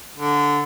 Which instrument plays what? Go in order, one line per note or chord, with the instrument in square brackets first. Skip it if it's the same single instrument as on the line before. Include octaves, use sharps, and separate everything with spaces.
[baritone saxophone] D3